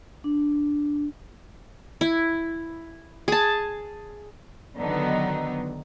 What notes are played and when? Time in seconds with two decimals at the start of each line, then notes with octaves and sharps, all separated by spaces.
0.24 D4
2.01 E4
3.28 G#4 A5
4.79 D3 D#3 F#3 B3 D#4